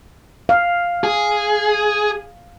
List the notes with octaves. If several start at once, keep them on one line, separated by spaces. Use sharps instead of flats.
F5
G#4